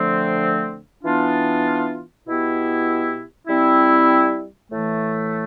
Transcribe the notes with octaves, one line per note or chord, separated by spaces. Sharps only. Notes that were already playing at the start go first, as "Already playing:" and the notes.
Already playing: D3 F3 A3 C4
E3 B3 D4 F4
B2 B3 E4 G4
G3 C4 E4
A2 E3 A3